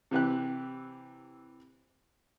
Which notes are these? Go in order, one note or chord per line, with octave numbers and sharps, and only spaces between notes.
C3 E3 G4 F#6